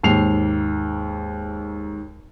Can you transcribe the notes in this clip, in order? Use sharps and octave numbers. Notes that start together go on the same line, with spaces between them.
D#2 G#2 C7 F7